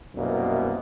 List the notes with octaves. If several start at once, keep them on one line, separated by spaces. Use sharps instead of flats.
C2 F#2 B2 A#3